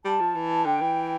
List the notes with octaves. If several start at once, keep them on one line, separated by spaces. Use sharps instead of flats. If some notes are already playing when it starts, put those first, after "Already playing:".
G3 A5
F3
E3
D3 G5
E3